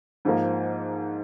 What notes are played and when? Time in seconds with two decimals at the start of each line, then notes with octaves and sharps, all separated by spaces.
0.25 G#2 F3 A#3